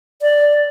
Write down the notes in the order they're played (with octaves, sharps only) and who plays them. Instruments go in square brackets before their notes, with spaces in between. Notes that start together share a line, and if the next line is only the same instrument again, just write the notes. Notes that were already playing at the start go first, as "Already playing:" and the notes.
[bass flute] D5